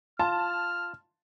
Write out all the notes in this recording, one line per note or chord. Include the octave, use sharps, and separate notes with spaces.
F4 A5 F6